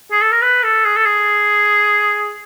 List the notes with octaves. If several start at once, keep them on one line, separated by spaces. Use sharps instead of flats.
G#4
A4
A#4
B4
A4
G#4
A4
G#4